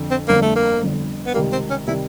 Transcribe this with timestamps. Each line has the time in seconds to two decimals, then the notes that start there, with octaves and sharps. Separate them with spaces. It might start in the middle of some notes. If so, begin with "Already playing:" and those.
Already playing: F2 D3
0.11 C4
0.28 G1 F2 D3 A#3
0.42 A3
0.56 A#3
0.82 G1 F2 D3
1.26 B3
1.34 C#2 C3 D#3 G3 A#3
1.52 C4
1.70 C#4
1.87 C3 D#3 G3 E4